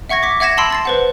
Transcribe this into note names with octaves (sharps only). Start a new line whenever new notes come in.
E5 F#5 C#6 G#6 A#6
D6 B6
E5 F#5 G#6 A#6 E7
A5 B5 C6 E6 C7 D7
A5 A6 C7
B4 C5 F#5